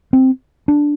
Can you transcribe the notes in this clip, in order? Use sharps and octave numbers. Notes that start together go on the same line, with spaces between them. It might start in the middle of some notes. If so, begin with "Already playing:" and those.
C4
D4